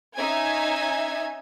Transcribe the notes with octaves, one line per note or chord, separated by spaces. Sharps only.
C#4 D#4 E5 G#5 G#6